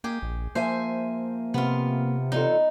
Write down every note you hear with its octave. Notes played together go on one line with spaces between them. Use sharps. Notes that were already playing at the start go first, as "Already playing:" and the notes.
A#3 G4 G#4
A#1
F3 A#3 C5 E5 G#5
C3 B3 F4
E2 D#4 F4 A4